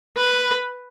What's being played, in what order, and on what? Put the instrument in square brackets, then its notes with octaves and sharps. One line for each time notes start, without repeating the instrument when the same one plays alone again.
[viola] B4